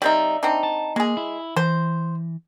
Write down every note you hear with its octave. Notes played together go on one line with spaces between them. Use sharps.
G3 C4 D#4 D5 E5
C4 D4 D#4
A5
G#3 A#3 G#4
E4
E3 C5